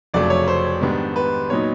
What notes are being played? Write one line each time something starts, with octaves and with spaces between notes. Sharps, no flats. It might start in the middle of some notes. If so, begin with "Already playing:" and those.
F1 F2 C#3 F#3 A3 D5
C#5
C5
G#2 D#3 G3 B3 D4
B4
A#2 F#3 B3 D#4 C#5